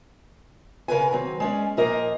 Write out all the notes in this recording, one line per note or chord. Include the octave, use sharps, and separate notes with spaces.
C#3 A#4 B4 G#5
D#3 F#3 C4
G#3 C#4 D5
A#2 F3 A#3 A#4 D#5